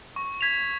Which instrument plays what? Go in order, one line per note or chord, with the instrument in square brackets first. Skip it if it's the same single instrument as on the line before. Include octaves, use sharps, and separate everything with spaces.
[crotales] C#6
G#6 B6 F7